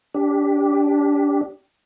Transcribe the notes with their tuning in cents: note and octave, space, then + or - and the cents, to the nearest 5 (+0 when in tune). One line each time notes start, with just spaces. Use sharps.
D4 -30 G4 +0